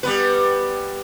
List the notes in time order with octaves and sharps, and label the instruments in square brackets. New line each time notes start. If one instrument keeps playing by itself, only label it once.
[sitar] G3 B3 B4